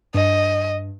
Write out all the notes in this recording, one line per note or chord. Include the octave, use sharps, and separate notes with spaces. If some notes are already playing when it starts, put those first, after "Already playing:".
G2 D#5